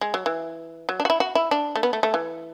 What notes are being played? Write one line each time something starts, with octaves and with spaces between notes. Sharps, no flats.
G#3
F#3
E3
F#3
D4
F#4
E4
F#4
E4
D4
A3
B3
A3
A3
E3